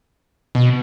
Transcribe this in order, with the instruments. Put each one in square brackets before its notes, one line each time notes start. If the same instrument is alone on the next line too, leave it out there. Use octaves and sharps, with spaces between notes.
[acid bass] B2